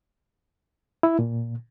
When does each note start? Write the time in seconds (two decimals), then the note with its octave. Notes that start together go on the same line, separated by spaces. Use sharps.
1.03 E4
1.19 A#2